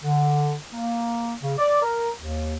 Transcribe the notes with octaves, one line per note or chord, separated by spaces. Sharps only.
D3
A#3
C#3
D5
A#4
D#2